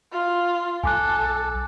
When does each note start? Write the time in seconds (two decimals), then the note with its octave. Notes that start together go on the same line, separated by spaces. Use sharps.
0.12 F4
0.84 B1 A4 G#5 D6 F#6